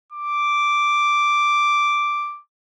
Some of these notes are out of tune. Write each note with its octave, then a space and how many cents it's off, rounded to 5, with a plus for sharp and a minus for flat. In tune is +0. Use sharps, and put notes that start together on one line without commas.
D6 +0